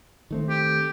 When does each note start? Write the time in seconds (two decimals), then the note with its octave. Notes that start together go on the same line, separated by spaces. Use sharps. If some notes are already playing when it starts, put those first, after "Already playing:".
0.31 D#3 A3 C4
0.49 G4